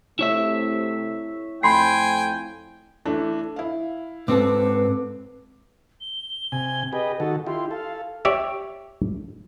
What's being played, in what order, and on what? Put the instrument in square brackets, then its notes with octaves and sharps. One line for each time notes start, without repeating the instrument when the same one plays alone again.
[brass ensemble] C3 A3 [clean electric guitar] E4 C#5 E5
[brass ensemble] F2 A3 [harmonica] G5 G#5 [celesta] B5 C6 C7
[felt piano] E3 A3 D4
E4 F5
[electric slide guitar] G#2 C4 A4 [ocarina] B4 [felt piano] D6
[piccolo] G7
[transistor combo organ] C3 G#5
[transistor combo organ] G4 G#4 B4 [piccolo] D#5
[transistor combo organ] D#3 F#4 A4
[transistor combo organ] E4 F4 G4 [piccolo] C6
[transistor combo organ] A4 [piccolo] F5
[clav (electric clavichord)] G4 C#5 D5 E5